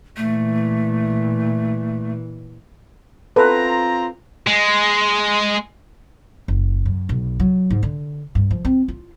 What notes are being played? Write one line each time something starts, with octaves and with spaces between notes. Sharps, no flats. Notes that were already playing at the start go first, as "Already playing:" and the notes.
A#2 E3 A3
C4 F4 A4 B4 A#5
G#3
F#1
F#2
B1
F#3
G#2
D3
G2
F3
C4
F4